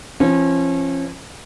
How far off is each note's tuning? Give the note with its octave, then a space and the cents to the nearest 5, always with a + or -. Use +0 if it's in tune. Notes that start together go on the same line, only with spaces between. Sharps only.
F3 -35 C#4 -35